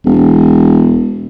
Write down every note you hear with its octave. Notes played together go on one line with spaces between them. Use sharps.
E1